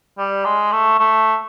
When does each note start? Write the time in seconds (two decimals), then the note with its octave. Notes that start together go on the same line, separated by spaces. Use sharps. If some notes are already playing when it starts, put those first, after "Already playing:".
0.19 G3
0.45 G#3
0.72 A3
0.99 A3